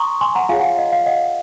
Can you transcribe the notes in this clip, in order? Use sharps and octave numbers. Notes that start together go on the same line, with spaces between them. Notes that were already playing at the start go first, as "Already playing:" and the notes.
Already playing: A#5 C6 C#6 D#6
G#5 C6
F#5 A#5
F4 G#4 C#5 F5 G#5
F#5
F5
D#5
F5
D#5 F#5